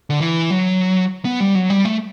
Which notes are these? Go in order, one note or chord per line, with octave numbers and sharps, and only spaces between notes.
D3
E3
F#3
B3
G3
F#3
G3
A3